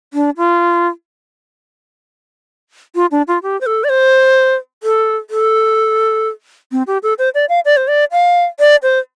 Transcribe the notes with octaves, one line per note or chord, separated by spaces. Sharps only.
D4
F4
F4
D4
F4
G4
C5
A4
D5
C5
A4
A4
C4
G4
A4
C5
D5
F5
D5
C5
D5
F5
D5
C5